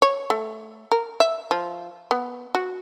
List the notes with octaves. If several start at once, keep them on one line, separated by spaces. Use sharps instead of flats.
C#5
A3
A#4
E5
F3
B3
F#4